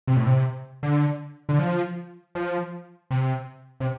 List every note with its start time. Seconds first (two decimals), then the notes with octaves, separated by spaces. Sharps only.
0.07 C3
0.17 A2
0.26 C3
0.83 D3
1.49 D3
1.59 F3
2.35 F3
3.11 C3
3.80 C3